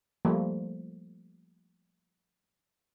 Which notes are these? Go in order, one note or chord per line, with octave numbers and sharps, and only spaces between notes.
F3 G3 A3 A#3